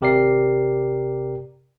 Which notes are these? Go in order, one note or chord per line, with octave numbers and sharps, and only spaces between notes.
G#1 C3 G4 A#4 D5 C7